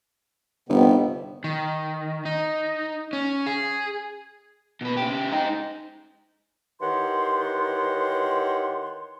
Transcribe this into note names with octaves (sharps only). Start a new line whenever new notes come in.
G1 C3 D#3 B3
D#3
D#4
C#4
G#4
B2 B4
C#3 G4
G#3 D#4
D#3 E3 G4 C#5 F#5 C6